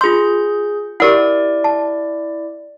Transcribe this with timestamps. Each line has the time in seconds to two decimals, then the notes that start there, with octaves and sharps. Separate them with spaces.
0.01 F4 G#4 C6 G6
1.00 E4 G4 A#4 D5 F#5
1.64 A5